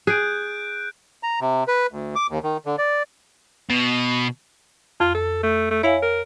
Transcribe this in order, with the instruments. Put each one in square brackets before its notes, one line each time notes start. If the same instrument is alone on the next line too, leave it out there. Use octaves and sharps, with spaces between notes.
[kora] G#4 [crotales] F#6 G6 D7
[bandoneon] A#5
C3
B4
D2
D6
D#2
D#3
D3
D5
[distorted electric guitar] B2
[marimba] F2 [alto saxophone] F4
[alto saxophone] A4
A3
A3
[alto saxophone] E4 [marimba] C#5 F5 G#5
[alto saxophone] A#4